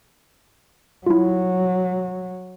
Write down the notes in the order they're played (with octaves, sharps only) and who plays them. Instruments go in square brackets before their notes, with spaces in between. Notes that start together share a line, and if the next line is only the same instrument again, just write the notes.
[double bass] F#3 [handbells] E4 F4